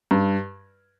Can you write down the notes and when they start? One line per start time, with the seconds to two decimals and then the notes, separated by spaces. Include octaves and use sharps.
0.11 G2